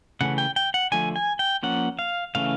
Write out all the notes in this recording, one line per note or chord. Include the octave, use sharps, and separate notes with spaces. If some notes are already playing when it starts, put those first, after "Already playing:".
C#3 E3 A3 C#4 F#5
G5
G5
F#5
D3 F3 A3 G#5
G#5
G5
F3 A#3 C#4 F#5
F5
C#3 E3 A3 C#4 F5